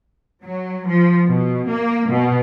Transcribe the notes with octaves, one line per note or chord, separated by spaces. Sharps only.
F#3
F3
B2
A#3
B2